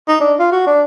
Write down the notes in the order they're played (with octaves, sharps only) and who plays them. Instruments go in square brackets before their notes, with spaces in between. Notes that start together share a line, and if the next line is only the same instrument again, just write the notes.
[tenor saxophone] D#4
D4
F4
F#4
D4